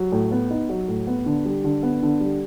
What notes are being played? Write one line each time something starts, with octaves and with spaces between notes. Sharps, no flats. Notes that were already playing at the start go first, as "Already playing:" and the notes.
Already playing: F#3
A2
B3
D#4
F#3
A2
B3
D3
G3
D3
B3
D3
G3